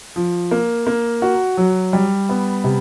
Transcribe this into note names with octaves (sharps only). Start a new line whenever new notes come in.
F3
A#3
A#3
F#4
F#3
G3
B3
C3